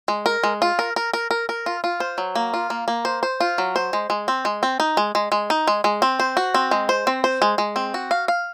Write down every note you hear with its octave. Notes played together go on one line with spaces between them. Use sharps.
G#3
A#4
G#3
F4
A#4
A#4
A#4
A#4
A#4
F4
F4
C5
F#3
A#3
F4
A#3
A#3
C5
C5
F4
F#3
C5
G#3
G#3
C4
G#3
C4
D#4
G#3
G#3
G#3
D#4
G#3
G#3
C4
C5
F#4
C4
G#3
C5
C4
C5
G#3
G#3
C4
F#4
F5
F5